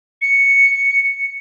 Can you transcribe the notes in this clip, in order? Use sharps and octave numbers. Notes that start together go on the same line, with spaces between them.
C#7